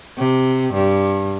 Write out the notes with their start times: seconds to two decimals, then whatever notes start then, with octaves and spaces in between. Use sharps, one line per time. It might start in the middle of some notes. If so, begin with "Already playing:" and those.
0.17 C3
0.73 G2